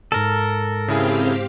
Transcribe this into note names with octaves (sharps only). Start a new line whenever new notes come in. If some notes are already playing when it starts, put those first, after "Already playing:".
C#2 G#2 A4 A#4
C#3 C4 E4 G4 G#4 F5